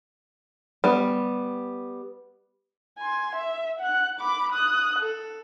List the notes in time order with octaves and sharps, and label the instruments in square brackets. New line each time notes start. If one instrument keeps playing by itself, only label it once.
[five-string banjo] G3 B3
[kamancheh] G#5 C6
E5
F#5 F#6
B5 D6
D#6 F#6
A4